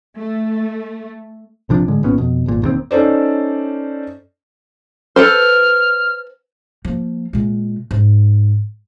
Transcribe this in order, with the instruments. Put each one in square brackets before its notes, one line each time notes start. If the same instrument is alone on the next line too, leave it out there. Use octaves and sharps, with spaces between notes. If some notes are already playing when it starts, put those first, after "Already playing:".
[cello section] A3
[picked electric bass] B1 C3 F3 D4
A2 D3 G#3
G#1 A#2 B3 C#4
F2 B2
D#1 G#1 A#2
E1 D#2 B2 C4
[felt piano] C#4 D#4 A4 C5 D5
[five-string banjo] A4 B4 C5 [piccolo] F6
[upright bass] F3 A#3
A#2 G#3
G#2